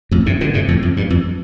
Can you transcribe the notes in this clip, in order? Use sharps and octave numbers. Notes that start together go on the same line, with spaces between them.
F2 A2
G2 C3
A2 D3
G2 C3
F2 A2
F2
G2
F2